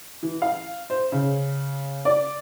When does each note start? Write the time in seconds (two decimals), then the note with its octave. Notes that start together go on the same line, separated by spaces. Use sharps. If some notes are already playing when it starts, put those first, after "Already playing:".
0.23 E3
0.42 F5
0.90 C5
1.12 C#3
2.05 D5